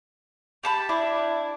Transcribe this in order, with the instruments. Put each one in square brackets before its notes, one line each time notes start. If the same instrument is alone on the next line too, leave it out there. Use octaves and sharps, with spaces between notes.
[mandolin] G4 A5 B5
[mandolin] D4 [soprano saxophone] E4